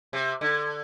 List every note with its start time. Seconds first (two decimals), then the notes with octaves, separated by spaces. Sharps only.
0.13 C3
0.41 D3